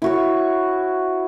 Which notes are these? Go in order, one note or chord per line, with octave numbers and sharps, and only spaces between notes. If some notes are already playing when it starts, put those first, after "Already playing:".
E4 F#4 C#5